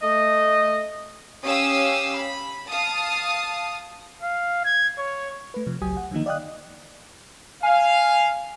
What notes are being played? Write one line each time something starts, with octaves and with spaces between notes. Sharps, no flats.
A3 D#5
C#4 G4 F5 D#6 E6
B5
F5 A5 D#6
F5
G#6
C#5
A3 B4
C3 F3
G#1 C#2 F#3 G4 G#5 D#6
F#5
D3 D#3 F3 A#3 D#4
D5 D#5 F5 G5 D#6 F#6
F5 G#5